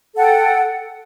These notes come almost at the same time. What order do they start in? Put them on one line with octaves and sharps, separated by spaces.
A4 F#5 G5